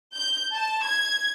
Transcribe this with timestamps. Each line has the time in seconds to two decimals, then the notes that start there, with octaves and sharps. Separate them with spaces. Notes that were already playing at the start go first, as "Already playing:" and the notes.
0.15 G6
0.54 A5
0.85 G#6